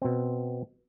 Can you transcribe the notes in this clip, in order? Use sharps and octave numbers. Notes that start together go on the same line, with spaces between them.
B2 C4